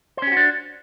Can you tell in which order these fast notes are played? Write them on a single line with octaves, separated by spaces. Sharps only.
C5 C#4 G4 F#4 D4